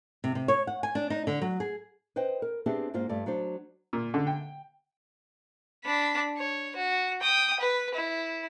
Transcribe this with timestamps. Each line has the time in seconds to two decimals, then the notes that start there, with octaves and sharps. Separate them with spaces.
0.24 C3
0.35 C3
0.48 C#5
0.67 F#5
0.83 G#5
0.95 D4
1.10 D#4
1.27 D3
1.42 F#3
1.60 G#4
2.16 B4 C5 D#5 G5
2.42 A#4
2.66 B3 C4 D4 G4 G#4 E5
2.94 G#2 A#3 F4 C5
3.09 G2 A3 D5
3.26 F#3 D4 C5
3.93 A#2
4.14 D3
4.27 G5
5.85 D4 B5
6.37 C#5
6.76 F#4
7.21 G5 D#6
7.60 B4
7.94 E4